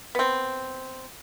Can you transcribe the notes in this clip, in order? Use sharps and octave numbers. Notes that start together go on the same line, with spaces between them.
B3 C4